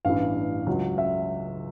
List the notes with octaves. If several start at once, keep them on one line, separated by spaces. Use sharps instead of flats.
A1 G2 E3 F5
C#2 C#3 F#3
E5